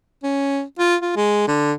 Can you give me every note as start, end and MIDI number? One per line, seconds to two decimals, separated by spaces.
0.23 0.62 61
0.79 0.96 65
1.01 1.16 65
1.16 1.46 56
1.48 1.73 50